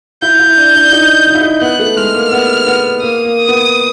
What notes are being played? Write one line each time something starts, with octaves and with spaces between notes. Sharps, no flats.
E4 G6
E4
D4
D4
D#4
D#4
E4
D#4
B3 F#6
A3
G#3 F6
A#3
B3
B3
A#3 D#6
A#3
B3